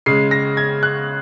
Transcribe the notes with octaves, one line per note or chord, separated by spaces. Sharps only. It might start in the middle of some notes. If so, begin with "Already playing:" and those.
C#3 G#3 C7
A#6
G#6
F#6